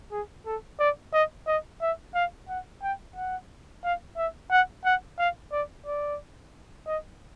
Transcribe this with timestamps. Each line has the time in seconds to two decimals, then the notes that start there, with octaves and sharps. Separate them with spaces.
0.12 G#4
0.46 A4
0.80 D5
1.13 D#5
1.47 D#5
1.81 E5
2.15 F5
2.49 F#5
2.83 G5
3.16 F#5
3.84 F5
4.17 E5
4.51 F#5
4.85 F#5
5.18 F5
5.52 D5
5.86 D5
6.87 D#5